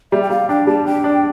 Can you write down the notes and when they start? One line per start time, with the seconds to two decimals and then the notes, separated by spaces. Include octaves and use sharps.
0.12 G3 E5
0.22 G5
0.30 G3 F5
0.49 D4 G5
0.67 G3 A5
0.85 D4 G5
1.04 D4